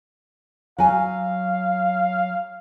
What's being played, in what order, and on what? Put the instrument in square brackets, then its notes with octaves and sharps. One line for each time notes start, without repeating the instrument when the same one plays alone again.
[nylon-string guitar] F#3 G#5 [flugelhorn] F5